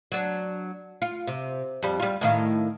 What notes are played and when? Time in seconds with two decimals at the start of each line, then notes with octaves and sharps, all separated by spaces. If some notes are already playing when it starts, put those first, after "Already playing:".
0.12 F#3 D4
1.02 F4
1.27 C3
1.82 F2 G3
2.00 G3 F4
2.21 A2 D#3 F5